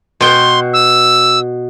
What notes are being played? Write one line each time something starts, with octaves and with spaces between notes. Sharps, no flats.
B2 G5 C6
E6